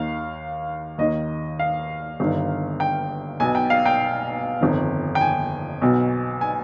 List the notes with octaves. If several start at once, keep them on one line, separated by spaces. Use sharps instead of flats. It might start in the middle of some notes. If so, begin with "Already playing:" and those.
Already playing: D#2 D#3 F5
D#2 D#3 D#5
F5
G1 G2 D#3
G5
B1 B2 G#5
G5
F5
G5
G1 F2 D#3
G5
G#5
B1 B2
G#5